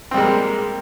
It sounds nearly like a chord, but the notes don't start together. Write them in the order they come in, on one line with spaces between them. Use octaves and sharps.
C4 G3 G#3 A#3